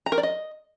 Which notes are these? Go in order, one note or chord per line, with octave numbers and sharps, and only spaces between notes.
A#5
A#4
D5
D#5